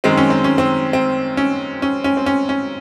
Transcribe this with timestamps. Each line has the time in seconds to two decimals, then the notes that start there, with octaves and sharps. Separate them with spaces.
0.04 F#2 D#3 G#3 C4
0.17 C#4
0.30 C4
0.44 C#4
0.58 C4
0.93 C4
1.37 C#4
1.82 C#4
2.04 C#4
2.17 C4
2.26 C#4
2.49 C#4